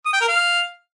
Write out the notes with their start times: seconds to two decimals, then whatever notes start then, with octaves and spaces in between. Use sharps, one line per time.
0.06 D#6
0.13 G5
0.21 A#4
0.28 F5